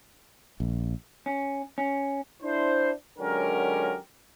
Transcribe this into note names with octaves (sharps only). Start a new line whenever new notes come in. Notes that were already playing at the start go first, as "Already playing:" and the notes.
A#1
C#4
C#4
D4 E4 C5
D3 F#3 G#3 C#4 G4 A#4